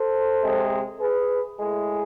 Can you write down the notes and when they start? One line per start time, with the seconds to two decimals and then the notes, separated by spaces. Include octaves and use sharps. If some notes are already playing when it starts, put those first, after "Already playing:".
Already playing: A4 C5
0.42 C3 G#3
1.01 G#4 B4
1.60 A2 G#3 E4 G#4